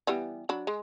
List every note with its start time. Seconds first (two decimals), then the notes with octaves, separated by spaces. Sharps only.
0.07 E3 G3 B3
0.49 F#3 D4 B5
0.67 G#3